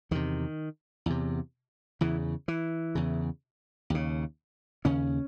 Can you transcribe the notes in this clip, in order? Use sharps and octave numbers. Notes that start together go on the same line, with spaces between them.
E2 C3 D#3
E2 C3
E2 C#3 E3
E3
E2 C#3
D#2 C#3
D#2 C#3 C#4